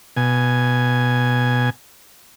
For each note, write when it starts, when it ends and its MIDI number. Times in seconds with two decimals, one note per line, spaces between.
0.17 1.70 47
0.17 1.70 80